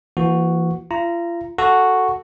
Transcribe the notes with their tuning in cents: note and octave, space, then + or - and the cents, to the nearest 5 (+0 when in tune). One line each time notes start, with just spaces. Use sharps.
E3 +35 A#3 +0 F#4 +0
F4 -40 A#5 +0
F#4 +0 A4 +0